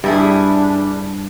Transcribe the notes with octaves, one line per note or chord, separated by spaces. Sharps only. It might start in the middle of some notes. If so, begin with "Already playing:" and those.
G2 G3 D4 E4 G#4